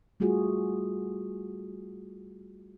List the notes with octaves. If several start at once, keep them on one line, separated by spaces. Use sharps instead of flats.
G3 A3 F4 F#4 G#4